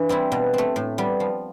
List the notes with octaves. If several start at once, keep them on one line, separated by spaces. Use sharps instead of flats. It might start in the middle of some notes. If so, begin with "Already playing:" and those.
Already playing: E3 D4
G3 C4 E4
B2
A3 C4
A2
G3 B3
F3